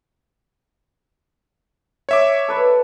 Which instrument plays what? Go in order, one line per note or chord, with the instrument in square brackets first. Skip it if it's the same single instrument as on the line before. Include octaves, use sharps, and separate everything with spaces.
[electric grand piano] C#5 E5 D6
[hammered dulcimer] A4 B4 D5